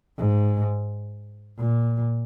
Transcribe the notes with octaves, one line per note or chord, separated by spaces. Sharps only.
G#2
A#2